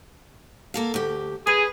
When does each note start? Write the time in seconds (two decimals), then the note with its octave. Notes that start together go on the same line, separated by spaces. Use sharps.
0.74 A#3 A4 F5
0.94 D2 G4
1.47 G#4 B4